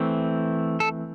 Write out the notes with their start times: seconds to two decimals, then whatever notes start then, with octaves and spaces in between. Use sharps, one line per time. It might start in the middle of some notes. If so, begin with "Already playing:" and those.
Already playing: E3 A3 C4
0.80 A4